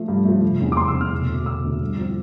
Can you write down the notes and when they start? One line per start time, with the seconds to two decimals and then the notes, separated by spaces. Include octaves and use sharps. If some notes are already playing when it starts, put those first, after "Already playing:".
Already playing: F3 A3
0.08 G2
0.25 F3 A3
0.43 F1
0.60 E2 C3
0.72 D6
0.77 F1 C6
0.88 E6
0.95 E2 C3
1.01 F6
1.12 E1
1.28 D2 D3 A3
1.46 E1 E6
1.64 D2 D3 A3
1.81 G2
1.98 F3 C4 E4